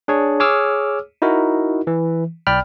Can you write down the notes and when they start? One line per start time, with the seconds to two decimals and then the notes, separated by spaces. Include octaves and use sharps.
0.08 D4 G#4 C#5
0.40 G#4 C#5 D6 E6 F6
1.22 D#4 E4 F#4 A#4
1.87 E3
2.47 B1 D5 G5 B5 F6